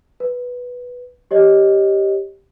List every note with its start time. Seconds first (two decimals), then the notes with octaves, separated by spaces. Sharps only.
0.20 B4
1.31 G4 C#5 D#5